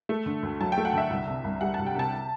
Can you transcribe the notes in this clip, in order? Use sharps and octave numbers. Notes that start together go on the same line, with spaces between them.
A3
D3
D2
F#3 A5
G5
A3
F#5
D3 E5
C2
C3
C2
G3 F#5
C2 A5
G5
C3 A5